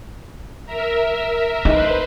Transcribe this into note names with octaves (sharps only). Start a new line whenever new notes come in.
A#4 E5
D#4 B4 C5